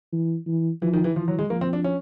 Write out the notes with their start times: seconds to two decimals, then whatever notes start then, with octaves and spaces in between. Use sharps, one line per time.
0.13 E3
0.47 E3
0.82 E3 F3
0.93 D#3
1.04 E3
1.16 E3 F3
1.28 F#3
1.39 G#3
1.50 F3 A#3
1.61 C4
1.73 D4
1.84 C#4